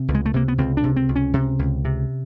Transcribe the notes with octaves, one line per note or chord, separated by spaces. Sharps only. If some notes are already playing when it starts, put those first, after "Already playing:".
Already playing: C3
C#2
G#3
A3
C3 A#3
B3
C#2 C4
D4
C3
C4
C#2
C#4
C3
C#2
C3